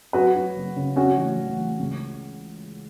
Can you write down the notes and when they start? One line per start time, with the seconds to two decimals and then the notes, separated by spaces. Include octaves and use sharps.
0.13 F#2 F#4 B4
0.35 F#3
0.56 F#1
0.76 C#3
0.96 F#3 C#4 F#4
1.17 A1
1.38 A1
1.59 A1
1.79 C#2